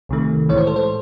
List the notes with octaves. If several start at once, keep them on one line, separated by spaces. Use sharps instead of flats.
C2 C3 D#3 A3
A2 E3 G#3 C#5
C5
A4
C5